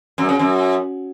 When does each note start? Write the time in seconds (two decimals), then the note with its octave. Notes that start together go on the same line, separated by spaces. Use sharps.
0.18 F#2
0.29 C#3
0.39 F#2